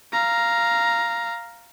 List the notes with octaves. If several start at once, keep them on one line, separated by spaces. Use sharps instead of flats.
F5 A#5